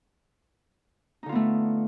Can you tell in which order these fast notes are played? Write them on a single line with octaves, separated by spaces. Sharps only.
D#4 D3 F4 B3 A3